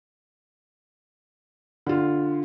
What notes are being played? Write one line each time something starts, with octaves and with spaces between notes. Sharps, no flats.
D3 F4